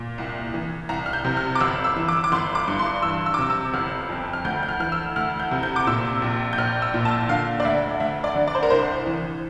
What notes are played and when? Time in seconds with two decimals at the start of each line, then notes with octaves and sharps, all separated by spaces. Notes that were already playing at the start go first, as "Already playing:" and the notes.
Already playing: A#2
0.18 C2
0.54 E3
0.89 C2 A#5
1.06 F6
1.13 G6
1.25 C3
1.37 F6
1.55 D6
1.61 G1 E6
1.84 E6
1.96 E3
2.08 D6
2.24 D6
2.32 G1 C6
2.55 D6
2.68 G2
2.79 C6
3.02 E3 E6
3.26 E6
3.34 D6
3.38 C3 E6
3.50 E6
3.74 G1 F6
4.09 F2
4.33 F6
4.44 D2 G6
4.63 G6
4.69 F6
4.80 E3 F6
4.92 E6
5.16 D2 F6
5.39 G6
5.51 C3
5.63 G6
5.76 D6
5.87 A#2 E6
6.22 A#1
6.53 G6
6.58 A#1 F6
6.82 E6
6.94 A#2
7.05 A5
7.29 D3 F5
7.60 D5
7.65 D2 E5
8.00 D2 E5
8.24 D5
8.35 D3
8.48 D5
8.55 C5
8.63 A#4
8.70 C2 C5
9.07 E3